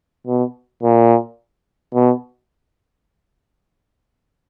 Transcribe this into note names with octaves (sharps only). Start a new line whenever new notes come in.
B2
A#2
B2